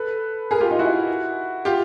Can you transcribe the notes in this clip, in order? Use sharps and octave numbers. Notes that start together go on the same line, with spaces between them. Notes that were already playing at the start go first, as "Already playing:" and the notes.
Already playing: A4 B4
G#4 A#4
F4 G4
D#4 F4
E4 F#4
F4 G4